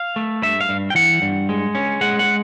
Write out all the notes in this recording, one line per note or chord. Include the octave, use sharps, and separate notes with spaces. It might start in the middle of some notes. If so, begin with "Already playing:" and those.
Already playing: F5
A3
G2 E5
F5
G2
G5
E3 F#5
G2
G#3
C#4
G#3 F#5
F#5